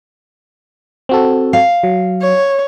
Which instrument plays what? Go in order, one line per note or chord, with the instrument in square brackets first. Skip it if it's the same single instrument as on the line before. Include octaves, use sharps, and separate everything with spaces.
[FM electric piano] C4 F#4 A4
[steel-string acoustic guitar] F5
[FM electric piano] F#3
[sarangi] C#5